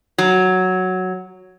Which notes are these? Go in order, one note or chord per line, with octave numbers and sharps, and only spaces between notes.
F#3